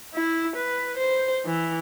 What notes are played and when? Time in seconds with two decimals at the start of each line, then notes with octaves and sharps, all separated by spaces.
0.14 E4
0.56 B4
0.97 C5
1.46 E3